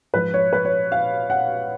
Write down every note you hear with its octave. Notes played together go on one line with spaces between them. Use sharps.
G#2 F3 B4
C#5
B4
C#5
F5
F#5